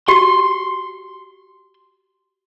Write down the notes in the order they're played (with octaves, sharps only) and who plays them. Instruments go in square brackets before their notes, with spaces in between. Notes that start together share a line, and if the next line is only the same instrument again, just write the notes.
[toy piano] F#4 G4 [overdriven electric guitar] C6